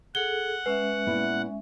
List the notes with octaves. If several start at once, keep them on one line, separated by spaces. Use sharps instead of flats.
G#4 A4 F#5 G7
G#3 C#4 B4 E5
A#2 B3 E4